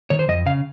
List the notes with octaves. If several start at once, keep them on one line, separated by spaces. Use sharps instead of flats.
D#3 C#5
C5
F2 D#5
C#3 F5